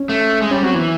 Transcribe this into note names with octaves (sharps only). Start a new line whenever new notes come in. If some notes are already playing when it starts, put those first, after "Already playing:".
Already playing: C#4
A3
G#3
G3 C#4
F#3 C4
E3 B3